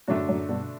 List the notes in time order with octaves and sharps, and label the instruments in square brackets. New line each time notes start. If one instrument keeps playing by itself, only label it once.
[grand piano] F#2 A2 [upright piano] D3 A3 D4 F#4
[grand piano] F#2 A2
G2 B2